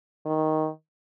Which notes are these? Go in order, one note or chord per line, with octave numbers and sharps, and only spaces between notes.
D#3